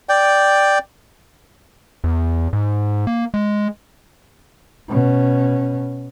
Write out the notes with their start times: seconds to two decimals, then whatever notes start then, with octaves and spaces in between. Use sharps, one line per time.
0.09 D5 G5
2.04 E2
2.53 G#2
3.07 A#3
3.34 G#3
4.89 B2 C#4